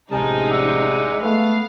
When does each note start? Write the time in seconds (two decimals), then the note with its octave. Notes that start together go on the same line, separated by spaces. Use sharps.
0.11 A1 C3 F3 G#3 D#4 G#4 A#4 A5
0.50 D5 E5 F#5
1.21 A3 B3 B4 F5